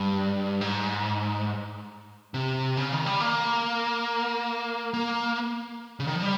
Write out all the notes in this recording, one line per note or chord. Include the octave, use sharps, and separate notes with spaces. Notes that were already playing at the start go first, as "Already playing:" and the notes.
Already playing: G2
G#2
C3
C#3
D#3
G3
A#3
A#3
C#3
D#3
F3
G3